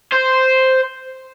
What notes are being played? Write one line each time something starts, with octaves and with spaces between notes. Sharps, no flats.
C5